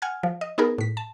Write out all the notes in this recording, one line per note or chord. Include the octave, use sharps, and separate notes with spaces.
F#5 G#5 F6 G#6
F3
D#5
B3 D#4 G#4 A#4
A2 B6
A5